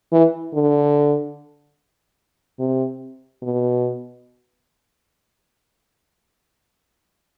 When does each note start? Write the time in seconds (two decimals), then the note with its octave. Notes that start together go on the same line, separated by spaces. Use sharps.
0.12 E3
0.54 D3
2.59 C3
3.42 B2